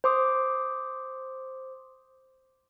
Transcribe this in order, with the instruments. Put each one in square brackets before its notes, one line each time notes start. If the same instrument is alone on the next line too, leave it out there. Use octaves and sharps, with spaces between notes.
[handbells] C5 C6 D6 D#6